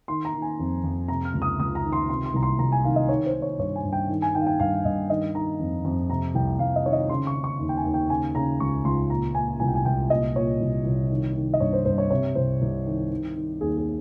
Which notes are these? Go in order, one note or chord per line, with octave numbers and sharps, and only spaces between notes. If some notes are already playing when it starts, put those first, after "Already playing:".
D#3 C6
A#5
D#3
G#5
F2
F2
C3 A#5
F6
C#2
D#6
C#2 D#6
A#5
D#3
C6
C3 C6
C6
C2 A#5
C6
C2 A#5
G#5
D#3 F5
D#5
D#3 C#5
C5
D#3
C#5
G2 C#5
G#5
G2
G5
D#3
G#5
D#3 G5
F5
G5
G2 F5
G2 D#5
D#3 D#5
D#3 A#5
F2
F2
C3 A#5
C2 G5
C2 F5
D#5
D#3 C#5
D#5
C#3 C6
C#6
C#3
C#6
D#2
G5
G#5
D#2
G5
C#3 G#5
C#3 A#5
C#2 C#6
C#2 C6
A#2 A#5
A#2 G#5
C2 G#5
G5
G#5
C2 G5
A#2 D#5
A#2 C#5
C2
C2
D#3
D#3
D#5
G2 C#5
C5
G2 C5
C#5
C3 C#5
C2 C5
C2
D#3
D#3
D#3
D#2 G#4
G#4